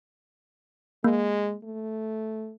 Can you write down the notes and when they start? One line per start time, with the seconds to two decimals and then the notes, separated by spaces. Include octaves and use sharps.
1.04 G#3 A#3
1.64 A3